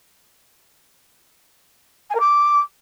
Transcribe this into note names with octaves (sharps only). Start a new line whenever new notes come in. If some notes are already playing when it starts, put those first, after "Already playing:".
G#5
A#4
D6